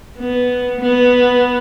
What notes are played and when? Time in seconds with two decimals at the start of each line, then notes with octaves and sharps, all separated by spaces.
0.19 B3
0.80 B3